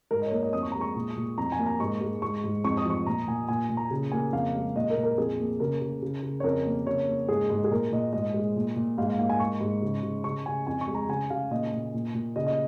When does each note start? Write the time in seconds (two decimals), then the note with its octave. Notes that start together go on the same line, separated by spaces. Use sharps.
0.11 G#2 A#4
0.22 D#5
0.26 C#5
0.31 A#3 A#4
0.43 D#5
0.53 F2 D#6
0.63 C#6
0.72 G#3 A#5
0.81 C#6
0.96 A#2
1.17 A#2
1.38 F2 A#5
1.52 G#5
1.59 A#3
1.66 A#5
1.80 G#2 C#6
2.01 G#3
2.22 G#2 C#6
2.44 G#2
2.64 F2 C#6
2.77 D#6
2.85 F3 C#6
3.07 A#2 A#5
3.27 A#2 G#5
3.49 A#2 G#5
3.70 A#2
3.77 A#5
3.91 C#3
4.12 A#3 G#5
4.33 F2 F5
4.55 G#3
4.76 A#2 D#5
4.90 A#4
4.97 A#2
5.03 A#4
5.18 F2 G#4
5.39 A#3
5.60 C#3 A#4
5.81 C#3
6.02 C#3
6.23 C#3
6.40 C#5
6.44 F2 A#4
6.66 A#3
6.87 C#3 C#5
7.08 A#3
7.29 G#2 G#4
7.50 G#2
7.64 G#4
7.71 A#2 A#4
7.92 A#2 D#5
8.13 G#2 D#5
8.34 G#3
8.56 A#2
8.76 A#2
8.98 G#2 F5
9.08 F5
9.19 A#3 F5
9.30 G#5
9.40 G#2 C#6
9.61 G#2
9.82 C#3
10.03 C#3
10.24 C#3 C#6
10.46 C#3 G#5
10.67 F2 G#5
10.81 C#6
10.88 G#3
10.95 A#5
11.09 C#3 G#5
11.30 C#3 F5
11.51 A#2 D#5
11.73 A#2
11.94 A#2
12.14 A#2
12.36 C#3 D#5
12.47 D#5